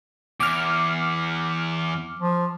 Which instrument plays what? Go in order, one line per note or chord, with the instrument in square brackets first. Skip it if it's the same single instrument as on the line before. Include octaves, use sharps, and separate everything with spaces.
[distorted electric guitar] E2 [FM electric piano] D6 F6
[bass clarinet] F3